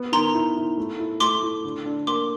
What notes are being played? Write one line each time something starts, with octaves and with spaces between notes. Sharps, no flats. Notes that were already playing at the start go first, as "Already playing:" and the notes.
Already playing: B3
D#3 A#5 C6
E4
E4
A3
E4
A3 C6 D6
E4
D3
D4
A#3 C6 D6